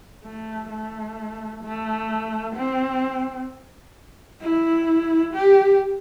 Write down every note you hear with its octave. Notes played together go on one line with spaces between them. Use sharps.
A3
A3
A3
C4
E4
G4